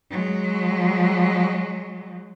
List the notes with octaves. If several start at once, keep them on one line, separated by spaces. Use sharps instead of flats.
F#3 G#3